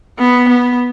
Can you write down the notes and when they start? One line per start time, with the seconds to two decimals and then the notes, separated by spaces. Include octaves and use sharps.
0.19 B3
0.49 B3